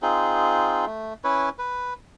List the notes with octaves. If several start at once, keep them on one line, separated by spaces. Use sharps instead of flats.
C4 D#4 F4 G#4
A3
C#4 E4 B4 C#5
B4